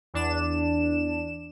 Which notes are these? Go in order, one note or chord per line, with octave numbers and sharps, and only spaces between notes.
E2 D4 E7